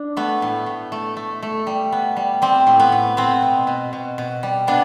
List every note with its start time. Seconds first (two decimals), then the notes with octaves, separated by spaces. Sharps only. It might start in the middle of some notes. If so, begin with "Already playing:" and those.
Already playing: D4
0.17 A3 B3
0.42 A2
0.66 A2
0.92 A3
1.17 A3
1.43 A3
1.67 G3
1.92 B3
2.17 G3
2.42 G3 C4
2.67 A2
2.80 B3
2.92 A2
3.17 B3 C4
3.42 B2
3.67 B2
3.93 B2
4.18 B2
4.43 G3
4.67 C3 B3 D4